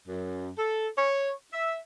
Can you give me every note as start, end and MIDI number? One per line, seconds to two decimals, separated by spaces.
0.08 0.49 42
0.58 0.87 69
0.98 1.31 73
1.53 1.78 76